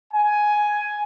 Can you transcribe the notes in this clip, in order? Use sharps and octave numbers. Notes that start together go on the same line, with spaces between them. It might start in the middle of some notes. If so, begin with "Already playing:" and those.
G#5